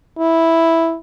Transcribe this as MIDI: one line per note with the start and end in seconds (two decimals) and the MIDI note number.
0.19 0.97 64